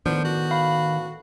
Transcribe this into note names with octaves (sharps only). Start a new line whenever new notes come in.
A2 D#3 F3 B3 D4 G6
F#4
F5 B5